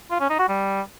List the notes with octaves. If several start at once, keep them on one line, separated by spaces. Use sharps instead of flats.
F4
C#4
D#4
F#4
G3